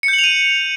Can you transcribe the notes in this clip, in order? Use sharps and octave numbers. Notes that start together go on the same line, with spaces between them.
C#7
G6
F#7
F7
D#7